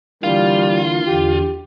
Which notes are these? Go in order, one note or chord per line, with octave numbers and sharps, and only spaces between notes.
D3 E3 G3 A#3 F4
E2 D3 G4